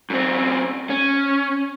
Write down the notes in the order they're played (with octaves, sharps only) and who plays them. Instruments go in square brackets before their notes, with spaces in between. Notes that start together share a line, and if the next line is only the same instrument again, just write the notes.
[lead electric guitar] F#2 C4
C#4